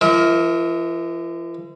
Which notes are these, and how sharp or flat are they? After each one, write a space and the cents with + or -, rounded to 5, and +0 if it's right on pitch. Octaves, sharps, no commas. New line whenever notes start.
F3 -45 A#4 +0 E5 -40